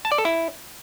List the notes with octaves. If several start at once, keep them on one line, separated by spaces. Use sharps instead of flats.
A5
D5
A4
E4